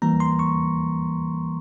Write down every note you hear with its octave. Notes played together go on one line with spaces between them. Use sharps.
E3 G3 A#3 A#5
C6
C#6